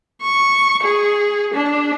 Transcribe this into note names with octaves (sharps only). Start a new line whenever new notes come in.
C#6
G#4
D4